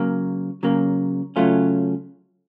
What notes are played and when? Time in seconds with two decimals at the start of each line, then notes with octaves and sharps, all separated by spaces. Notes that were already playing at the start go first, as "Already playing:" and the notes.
Already playing: C#3 F#3 A#3
0.63 C#3 F#3 A#3
1.36 C#3 F#3 A3 C#4 F4